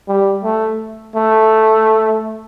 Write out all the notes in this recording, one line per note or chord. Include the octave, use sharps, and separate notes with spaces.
G3
A3
A3